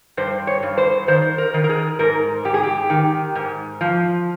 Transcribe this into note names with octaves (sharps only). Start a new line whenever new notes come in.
G2 C5
C#5
G2
C5
D#3 C5
A#4
D#3
A#4
G#4
G#2 A#4
G#2 G4
G#4
G4
D#3
G#2
F3